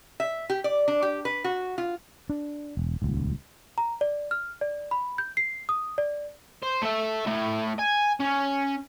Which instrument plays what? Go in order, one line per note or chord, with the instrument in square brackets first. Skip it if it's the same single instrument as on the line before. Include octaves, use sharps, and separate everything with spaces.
[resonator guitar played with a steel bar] E5
G4
D5
D4
G4
B4
F#4
F4
[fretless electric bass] D4
E1
D#1 C#2
[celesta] A#5
D5
F6
D5
B5
G6
C7
D#6
D5
[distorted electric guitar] C5
A3 E5
A2 A3
G#5
C#4